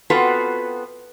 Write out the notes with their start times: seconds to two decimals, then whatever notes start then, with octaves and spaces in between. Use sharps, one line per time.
0.10 B3 C4 F4 F#4 A4 B4